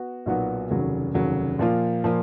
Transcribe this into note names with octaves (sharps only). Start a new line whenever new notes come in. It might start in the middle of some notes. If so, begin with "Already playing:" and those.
Already playing: B3 F#4
B1 A#2 F#3 B3 F#4
F1 D#2 C#3 F#3
F1 D#2 C#3 F#3
A#2 F3 A#3 F4
A#2 F3 A#3 F4